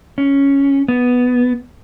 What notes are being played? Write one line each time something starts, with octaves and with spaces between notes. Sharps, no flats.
C#4
B3